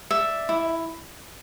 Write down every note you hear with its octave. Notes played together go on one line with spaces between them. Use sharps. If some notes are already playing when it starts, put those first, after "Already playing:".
D5 E5
E4